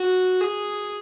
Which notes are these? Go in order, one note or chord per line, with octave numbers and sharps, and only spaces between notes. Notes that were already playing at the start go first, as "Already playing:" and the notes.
Already playing: F#4
G#4